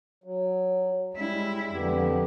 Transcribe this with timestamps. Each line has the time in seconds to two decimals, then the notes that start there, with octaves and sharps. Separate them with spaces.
0.24 F#3
1.14 G3 G#3 E4
1.73 F2 D3 B3 G4